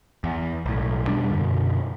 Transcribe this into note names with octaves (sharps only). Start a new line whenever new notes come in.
E2
B1 A2
E2 B2 G3 D4
F#2 B2 D3